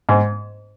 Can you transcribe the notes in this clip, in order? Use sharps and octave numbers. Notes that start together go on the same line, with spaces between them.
G#2